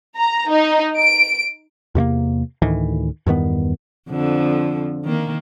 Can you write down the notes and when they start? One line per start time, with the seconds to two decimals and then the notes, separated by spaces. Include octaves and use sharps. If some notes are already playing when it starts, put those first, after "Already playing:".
0.16 A#5
0.49 D#4
0.97 D7
1.95 E2 C3 A3 A#3
2.62 D2 A2 D#3 E3
3.26 E2 G2 D#3 B3
4.09 F2 D3 F3
5.04 D#3 A#3